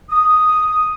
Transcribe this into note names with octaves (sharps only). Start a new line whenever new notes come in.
D#6